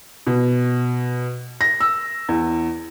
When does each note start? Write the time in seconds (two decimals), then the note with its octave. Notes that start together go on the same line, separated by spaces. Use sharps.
0.27 B2
1.61 A#6
1.80 E6
2.29 E2